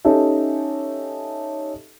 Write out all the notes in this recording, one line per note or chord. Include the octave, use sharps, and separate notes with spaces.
C#4 D#4 G4 A4 E5